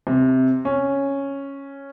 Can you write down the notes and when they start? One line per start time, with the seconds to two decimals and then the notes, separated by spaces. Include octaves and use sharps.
0.07 C3
0.65 C#4